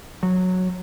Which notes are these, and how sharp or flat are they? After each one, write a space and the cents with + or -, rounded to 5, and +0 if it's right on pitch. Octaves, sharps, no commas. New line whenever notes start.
F#3 -10